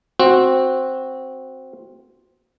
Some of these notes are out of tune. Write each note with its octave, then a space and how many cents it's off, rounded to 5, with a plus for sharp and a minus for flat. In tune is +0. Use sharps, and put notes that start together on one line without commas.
C4 +5 F#4 -5